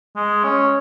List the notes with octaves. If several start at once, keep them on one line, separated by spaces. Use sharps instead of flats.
G#3
C#4